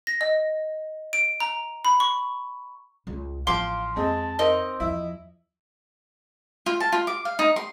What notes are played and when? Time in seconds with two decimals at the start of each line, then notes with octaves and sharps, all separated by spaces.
0.07 A#6
0.21 D#5
1.13 D7
1.40 A#5
1.85 B5
2.00 C#6
3.07 C#2 C#3
3.47 A1 F3 A3 F5 C6 D6
3.96 F2 G#3 C4 A5
4.39 C4 D#4 A#4 D#5
4.80 E2 F3 E4
6.66 F4
6.80 A5
6.92 F4
7.07 D6
7.25 F5
7.39 D#4
7.56 C6